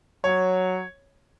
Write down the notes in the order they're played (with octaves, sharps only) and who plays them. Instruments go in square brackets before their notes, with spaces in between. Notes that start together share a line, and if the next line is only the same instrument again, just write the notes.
[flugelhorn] F#3 [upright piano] C#5